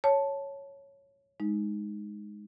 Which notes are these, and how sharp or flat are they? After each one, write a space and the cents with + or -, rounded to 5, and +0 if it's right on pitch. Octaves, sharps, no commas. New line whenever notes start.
C#5 +0 A5 +0
G#3 +0 D#4 +0